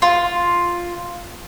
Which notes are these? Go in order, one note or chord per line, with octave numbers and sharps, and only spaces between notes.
F4